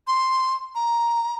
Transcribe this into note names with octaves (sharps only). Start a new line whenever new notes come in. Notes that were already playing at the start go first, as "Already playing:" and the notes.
C6
A#5